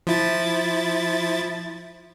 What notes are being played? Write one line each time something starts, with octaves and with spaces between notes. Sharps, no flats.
F3 E4 A6